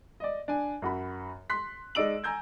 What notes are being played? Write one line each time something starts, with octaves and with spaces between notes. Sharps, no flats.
D5 D#5
D4 G#5
F#2 F#4 B5
C6 F#6 B6
G#3 D#4 D5 E6 D7 F#7
G#5 A#5 E6 G6 G#6